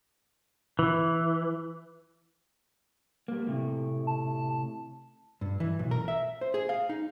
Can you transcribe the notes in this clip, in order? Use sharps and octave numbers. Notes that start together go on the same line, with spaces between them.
E3
G3 A#3
A2 C3 G3
A5
G2
E3
B1
A#4
E5
C5
G#4
F5
D#4